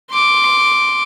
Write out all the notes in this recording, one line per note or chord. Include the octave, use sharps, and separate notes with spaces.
C6 D6